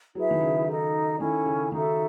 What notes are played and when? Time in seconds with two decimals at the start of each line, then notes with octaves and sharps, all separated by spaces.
0.15 F#3 E4 G#4 B4 E5
0.31 D#3
0.41 C#3
0.67 D#4 A4 D#5
1.20 D#3 C#4 E4 A4
1.46 C#3
1.72 D#3 D#4 F#4 A4 E5